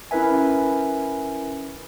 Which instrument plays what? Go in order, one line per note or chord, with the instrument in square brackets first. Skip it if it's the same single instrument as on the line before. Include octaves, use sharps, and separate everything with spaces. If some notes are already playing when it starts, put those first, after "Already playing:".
[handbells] C#4 E4 A#4 B4 E5 G#5